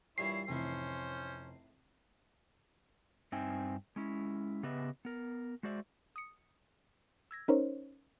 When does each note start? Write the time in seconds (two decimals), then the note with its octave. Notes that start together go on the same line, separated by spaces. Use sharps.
0.18 G2 A#2 E3 E4 C#5 C7
0.48 F1 A2 E3 C#4 E4 C5
3.32 G2 C4 D#4 E5 G5 G#5
3.96 G#3 C#4 E4
4.63 C#3 B3 G4 B4 D#5 E5
5.05 B3 A#4
5.63 G#3 F#4 C5 D5 E5
6.16 D#6 C#7
7.31 E6 G#6 A#6
7.48 C#4 D#4 A#4 C5 C#5